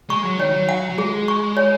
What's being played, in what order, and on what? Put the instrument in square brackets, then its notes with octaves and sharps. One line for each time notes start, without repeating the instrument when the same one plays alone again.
[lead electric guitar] G#3 [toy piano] C#6
[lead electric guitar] F#3
[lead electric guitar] D#3 [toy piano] C#5
[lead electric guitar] F#3
[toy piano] F#5
[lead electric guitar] F#3
[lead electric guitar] G#3 [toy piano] G#4
[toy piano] C#6
C#5